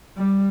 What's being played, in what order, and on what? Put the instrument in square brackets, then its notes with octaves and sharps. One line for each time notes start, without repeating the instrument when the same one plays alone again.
[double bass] G3